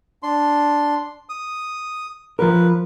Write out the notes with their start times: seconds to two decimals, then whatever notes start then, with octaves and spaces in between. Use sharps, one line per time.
0.23 D4 C6
1.29 D#6
2.39 F3 A#4 B4